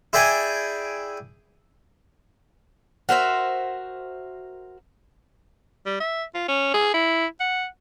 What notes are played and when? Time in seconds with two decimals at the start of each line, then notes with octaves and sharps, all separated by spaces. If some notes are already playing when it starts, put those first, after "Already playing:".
0.13 E4 G#4 D5 G5 G#5
3.09 F#4 A#4 C5 E5
5.86 G3
6.00 E5
6.35 F4
6.48 C#4
6.74 G#4
6.94 E4
7.40 F#5